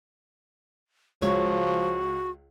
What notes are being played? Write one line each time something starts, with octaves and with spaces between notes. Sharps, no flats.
C#2 F3 F#4 C#5